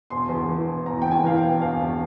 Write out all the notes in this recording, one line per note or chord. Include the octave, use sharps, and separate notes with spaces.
E1 C6
E2
E3
E1
E1 A#5
E2 G5
G#5
E3 F5
G5
E1
E1 F5
E2